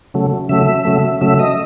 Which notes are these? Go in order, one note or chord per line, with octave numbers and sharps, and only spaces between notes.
C#3 F#3 A3
C#3 F#3 A3 E5
C#3 F#3 A3
C#3 F#3 A3 E5
D#5